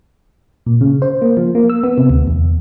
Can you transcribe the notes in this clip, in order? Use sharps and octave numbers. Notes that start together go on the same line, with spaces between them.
A#2
C#3
C5
A#3
F3
A#3
E6
B3
C3
D2
E2